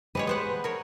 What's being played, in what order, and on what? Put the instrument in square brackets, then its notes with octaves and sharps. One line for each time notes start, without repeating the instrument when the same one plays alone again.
[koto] G3 G#3 C#5 [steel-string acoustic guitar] B4
[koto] B3 C5 F#5
A#4 C#5